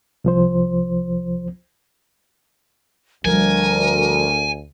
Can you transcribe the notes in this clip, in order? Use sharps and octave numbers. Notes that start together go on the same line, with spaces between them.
C2 F3 C5
D2 F3 G3 A#4 G#5